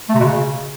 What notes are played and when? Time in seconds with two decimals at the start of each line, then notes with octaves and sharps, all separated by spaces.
0.09 A3
0.14 C3
0.19 B2
0.25 C#3